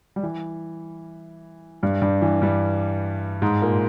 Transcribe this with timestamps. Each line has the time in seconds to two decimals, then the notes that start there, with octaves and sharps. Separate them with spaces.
0.16 G3
0.23 E3
1.83 G2 G3
2.02 G2 G3
2.22 E3
2.42 G2 G3
3.42 G#2 G#3
3.62 A#2 A#3